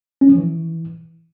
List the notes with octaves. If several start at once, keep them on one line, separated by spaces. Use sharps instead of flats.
C#4
F3
E3